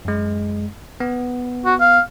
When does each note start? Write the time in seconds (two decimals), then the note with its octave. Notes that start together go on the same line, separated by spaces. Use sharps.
0.05 F#2 G#3
1.00 B3
1.66 F#4
1.80 F5